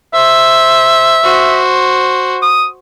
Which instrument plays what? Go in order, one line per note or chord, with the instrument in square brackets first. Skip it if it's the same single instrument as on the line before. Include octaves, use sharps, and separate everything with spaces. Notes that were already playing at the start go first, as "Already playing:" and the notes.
[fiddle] C5 [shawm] E5
[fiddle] F#4 C5
[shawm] D#6